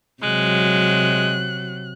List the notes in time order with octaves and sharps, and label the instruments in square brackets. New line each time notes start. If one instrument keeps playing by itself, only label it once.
[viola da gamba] C3 F#3 [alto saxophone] G#3 [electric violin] F#6